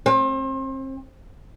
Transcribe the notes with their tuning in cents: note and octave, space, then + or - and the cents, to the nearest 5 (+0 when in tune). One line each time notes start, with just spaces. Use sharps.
C4 +35